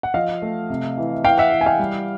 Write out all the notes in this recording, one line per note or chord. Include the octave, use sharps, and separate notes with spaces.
F#5
F3 D#5 F5
A3
C3
E3
E3 F5 G5
E5 F#5
E3
G#5
F5 G5
G3